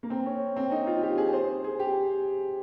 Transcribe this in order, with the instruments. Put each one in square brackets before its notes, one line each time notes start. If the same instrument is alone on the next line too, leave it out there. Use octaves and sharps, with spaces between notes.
[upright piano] A#3
C4
C#4
C4
D#4
F4
G4
G#4
C5
G#4
G4